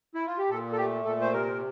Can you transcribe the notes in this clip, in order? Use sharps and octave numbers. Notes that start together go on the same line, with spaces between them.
E4
F4
G4
A#2 A4
A4
A3 G4
A#2 A4
C5
C3 A#4